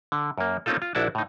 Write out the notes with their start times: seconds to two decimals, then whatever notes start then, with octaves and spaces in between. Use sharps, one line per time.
0.12 D3
0.38 F#2 A#3
0.66 A#3 C4 C#4 D#4 F4 A4
0.82 F4
0.95 A#1 D4 E4 F#4 A5
1.15 A2 D#4